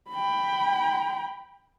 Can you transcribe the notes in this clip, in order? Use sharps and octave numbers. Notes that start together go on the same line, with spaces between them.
G5 B5